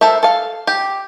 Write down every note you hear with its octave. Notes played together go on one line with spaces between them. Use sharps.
A4 A#4 C5 E5
A4 F5
G4